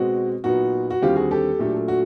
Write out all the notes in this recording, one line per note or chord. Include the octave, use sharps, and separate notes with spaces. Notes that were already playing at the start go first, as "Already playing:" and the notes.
Already playing: B2 G#3 C4 F#4
A#2 F#3 B3 D#4 F#4
F#4
D#2 D3 G3 C4 F4 G4
F#4 G#4
G4 A4
A#2 F#3 A3 D4
F#4